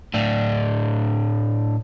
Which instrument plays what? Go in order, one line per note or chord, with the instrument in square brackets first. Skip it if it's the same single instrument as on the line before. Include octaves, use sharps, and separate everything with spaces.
[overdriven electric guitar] A2 D4